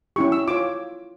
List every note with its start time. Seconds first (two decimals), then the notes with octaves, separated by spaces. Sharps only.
0.16 C#4 E4 G4 C#6
0.32 E6
0.48 F4 C#5 D6